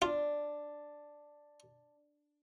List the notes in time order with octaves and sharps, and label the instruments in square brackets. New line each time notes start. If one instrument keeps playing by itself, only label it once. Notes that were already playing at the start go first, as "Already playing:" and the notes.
[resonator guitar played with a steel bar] D4 [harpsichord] F4